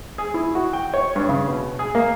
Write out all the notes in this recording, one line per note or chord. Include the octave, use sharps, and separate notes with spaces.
G#4
E4
F#4
G5
C#5
G2
C#3
B2
G#4
A#3